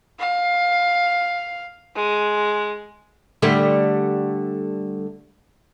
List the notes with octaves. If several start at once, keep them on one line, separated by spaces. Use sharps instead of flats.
F5
G#3
D3 G3 A3